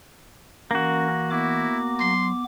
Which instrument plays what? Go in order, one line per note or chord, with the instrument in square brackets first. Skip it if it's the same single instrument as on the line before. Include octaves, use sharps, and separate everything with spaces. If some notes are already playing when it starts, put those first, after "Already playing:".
[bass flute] E3 [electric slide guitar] A#3 F#4 [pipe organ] C#4 A#4
[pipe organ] B3 D6 [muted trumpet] E4
[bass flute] F#3 [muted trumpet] C6